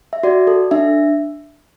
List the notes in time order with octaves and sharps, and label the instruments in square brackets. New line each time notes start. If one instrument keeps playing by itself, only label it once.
[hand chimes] E5
F#4 D5
A4
D4 E5